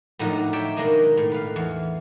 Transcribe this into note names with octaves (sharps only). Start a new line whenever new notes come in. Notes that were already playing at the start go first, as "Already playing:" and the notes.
A2 D3 F3 F#3 A3 D#4
C#5 D5 E5 G5
B2 D#3 G#3 A#3 D4 D#5
A2
B4 F5
E2